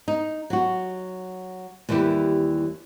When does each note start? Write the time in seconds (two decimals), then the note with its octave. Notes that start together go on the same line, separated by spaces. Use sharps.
0.08 D#4
0.50 F#3 F#4
1.89 D#2 E3 G3 E4 G4